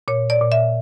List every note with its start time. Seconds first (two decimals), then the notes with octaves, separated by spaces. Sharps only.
0.08 A#2 C#5
0.30 D5
0.41 A#2
0.52 E5